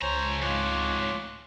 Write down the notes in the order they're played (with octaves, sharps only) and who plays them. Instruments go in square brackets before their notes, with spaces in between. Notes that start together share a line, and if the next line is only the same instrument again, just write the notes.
[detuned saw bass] C#2 [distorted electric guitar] F3 A#5 [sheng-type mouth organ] C5 C#6 [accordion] C#5 G#5
[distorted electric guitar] F2 G#2 [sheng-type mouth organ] F4 D6 F#6